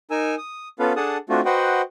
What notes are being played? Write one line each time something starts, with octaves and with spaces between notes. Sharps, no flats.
D#4 A#4 G#5 E6
D#6
B3 C#4 F4 A4 B4 F5
D4 G#4 A4 F#5 A5 D#6
A3 C4 D4 F4 F#4
F#4 B4 C5 D#5 F#5 G5